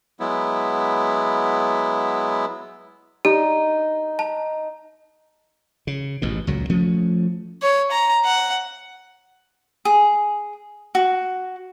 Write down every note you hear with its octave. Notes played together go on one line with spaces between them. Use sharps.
F#3 G#3 B3 E4
D#4 G4
A5
C#3
A1 G#2 B2
C#2 A#2 F#3
F3 A3 C#4
C#5
A#5
F#5
G#4
F#4